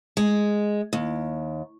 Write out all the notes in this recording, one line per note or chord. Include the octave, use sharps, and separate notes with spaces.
G#3
D#2